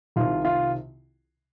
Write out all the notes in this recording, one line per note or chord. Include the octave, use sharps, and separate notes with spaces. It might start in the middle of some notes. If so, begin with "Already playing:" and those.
C2 C3 D#3 F4
F4